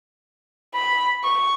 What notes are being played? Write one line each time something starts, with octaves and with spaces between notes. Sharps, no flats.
B5
C#6